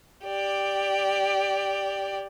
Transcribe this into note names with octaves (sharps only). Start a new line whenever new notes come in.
G4 D5